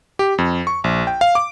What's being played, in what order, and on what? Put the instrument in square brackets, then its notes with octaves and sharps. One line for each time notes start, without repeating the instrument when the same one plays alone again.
[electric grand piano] G4
F2
C#6
A#1
G5
F5
D6